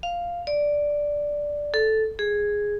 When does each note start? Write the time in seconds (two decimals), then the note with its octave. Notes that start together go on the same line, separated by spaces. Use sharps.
0.03 F5
0.47 D5
1.74 A4
2.19 G#4